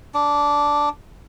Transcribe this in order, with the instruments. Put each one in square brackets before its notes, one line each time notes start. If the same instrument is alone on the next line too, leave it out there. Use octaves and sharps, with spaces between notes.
[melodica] D4